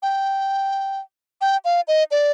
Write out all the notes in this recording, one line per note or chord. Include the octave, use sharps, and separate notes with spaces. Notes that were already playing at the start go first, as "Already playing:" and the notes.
G5
G5
F5
D#5
D5